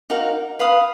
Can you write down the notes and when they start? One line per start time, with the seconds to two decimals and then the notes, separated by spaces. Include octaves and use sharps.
0.10 D#4 F#4 A#4 F5
0.59 B4 F5 B5 D#6